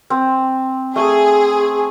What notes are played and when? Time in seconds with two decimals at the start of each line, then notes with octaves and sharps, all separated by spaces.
0.10 C4
0.96 A3 G#4